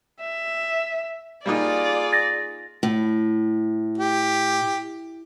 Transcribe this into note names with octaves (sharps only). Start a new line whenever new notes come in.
E5
G3 A#3 D#4 F4 G#4 D5
A6 A#6
A2
G4